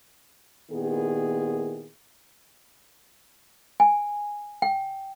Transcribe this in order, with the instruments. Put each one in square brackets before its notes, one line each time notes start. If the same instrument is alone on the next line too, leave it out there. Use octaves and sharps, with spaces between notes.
[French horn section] A#2 D#3 B3 E4 G4 G#4
[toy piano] G#5
G5